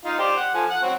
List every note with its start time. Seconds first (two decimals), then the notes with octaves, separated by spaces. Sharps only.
0.05 D#4 F4
0.19 G4 C5 D5
0.37 F#5
0.54 F3 A4 G#5
0.70 F#5
0.82 F#3 C4 F#4